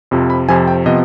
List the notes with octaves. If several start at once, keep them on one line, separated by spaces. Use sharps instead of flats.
F2 C3 F3
B5
F2 C3 F3 G#5
G5
C3 F3 B3 D#5